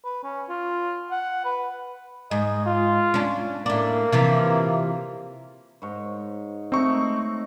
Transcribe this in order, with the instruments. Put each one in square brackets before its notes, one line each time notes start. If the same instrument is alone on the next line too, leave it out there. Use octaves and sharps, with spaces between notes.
[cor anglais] B4
C#4
F4
F#5
B4
[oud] G#2 [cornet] D#5
[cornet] F4
[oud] C#4 D4
[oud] A2 D4 [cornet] A#3
[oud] C3 E3 F3
[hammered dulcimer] G#2 C#5
[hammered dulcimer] A3 D#4 [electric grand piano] C4 C#6